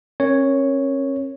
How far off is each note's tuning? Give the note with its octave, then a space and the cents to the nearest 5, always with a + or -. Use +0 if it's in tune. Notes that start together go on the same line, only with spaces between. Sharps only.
C#4 -40 A#4 +0 C#5 +0